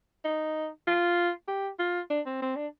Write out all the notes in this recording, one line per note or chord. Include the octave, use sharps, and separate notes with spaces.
D#4
F4
G4
F4
D4
C4
C4
D4